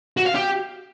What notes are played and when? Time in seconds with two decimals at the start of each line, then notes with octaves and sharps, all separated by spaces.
0.17 F#4
0.26 F5
0.35 G4